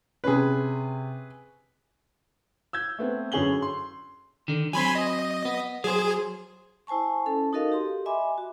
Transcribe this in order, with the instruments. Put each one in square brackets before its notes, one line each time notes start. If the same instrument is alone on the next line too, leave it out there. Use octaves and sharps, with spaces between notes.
[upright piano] C3 C#4 [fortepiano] G#4 B4
[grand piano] E6 G6 G#6
A3 B3 C4
F#2 D3 C#4 G#4 F#7 G7
C6
[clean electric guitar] D3 D#3
[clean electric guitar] F#3 C4 [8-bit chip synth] G#5 B5 C6
[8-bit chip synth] D#5
[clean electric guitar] B3
[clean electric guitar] F#3 C5 [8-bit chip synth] G#4
[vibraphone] E4 C5 G#5 A5 C#6
C#4 A4 A5
D#4 F#4 A4 A#4 D#5 F5
G4 C6
D#5 E5 G#5 B5 D6
F#4